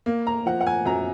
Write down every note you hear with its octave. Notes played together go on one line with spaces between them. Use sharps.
A#3
A#5
F3 F#5
F#5
G#5
F#2 A#5